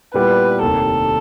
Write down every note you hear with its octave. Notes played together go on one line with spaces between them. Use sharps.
A#2 G3 B3 E4 B4
F1 D#2 D#3 A4